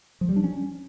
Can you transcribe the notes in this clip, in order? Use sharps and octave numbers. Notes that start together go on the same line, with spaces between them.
F3
G3
D4
C#4